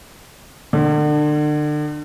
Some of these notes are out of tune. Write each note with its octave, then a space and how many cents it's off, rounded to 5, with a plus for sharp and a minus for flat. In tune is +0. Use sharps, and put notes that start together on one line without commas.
D3 +35